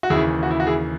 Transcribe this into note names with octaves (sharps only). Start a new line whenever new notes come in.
F#4
D#2 C#3 E3 E4 G#4
F#4
E4
F#4
E4 G#4